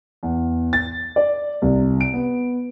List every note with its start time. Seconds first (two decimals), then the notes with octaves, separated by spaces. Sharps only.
0.23 E2
0.73 A6
1.16 D5
1.62 C2
2.01 D7
2.14 B3